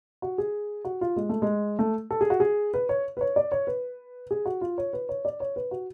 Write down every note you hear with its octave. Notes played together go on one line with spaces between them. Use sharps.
F#4
G#4
F#4
F4
G#3
A3
G#3
A3
A4
G#4
F#4
G#4
B4
C#5
B4
C#5
D5
C#5
B4
G#4
F#4
F4
C#5
B4
C#5
D5
C#5
B4
F#4